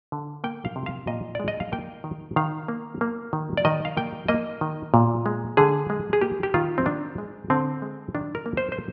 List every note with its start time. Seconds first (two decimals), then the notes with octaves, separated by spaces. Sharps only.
0.12 D3
0.44 A#3 G5
0.65 F5
0.76 C3
0.86 F5
1.07 A#2 D#5
1.35 G#3 D5
1.48 D#5
1.60 F5
1.72 A#3 G5
2.04 D#3
2.36 D#3 F5
2.68 A#3
3.01 A#3
3.33 D#3
3.57 D5
3.65 D#3 D#5
3.85 F5
3.97 A#3 G5
4.28 A#3 D#5
4.61 D#3
4.94 A#2
5.26 G#3
5.57 D3 G#4
5.90 G#3
6.13 G#4
6.21 A#3 G4
6.43 G4
6.54 D#3 F4
6.78 C4
6.86 D#3 D4
7.18 G#3
7.50 D3 C4
7.82 G#3
8.15 D#3 D4
8.35 A#4
8.46 A#3
8.57 C5
8.72 C5